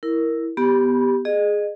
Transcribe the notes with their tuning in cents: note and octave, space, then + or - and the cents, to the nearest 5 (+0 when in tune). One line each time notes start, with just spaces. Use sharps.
E4 +0 A#4 +0
B3 +0 G4 +0 B5 -25
G#4 +5 D#5 -30